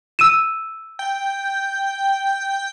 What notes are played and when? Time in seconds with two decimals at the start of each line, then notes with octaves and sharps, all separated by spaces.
0.19 E6 D#7 E7
0.99 G5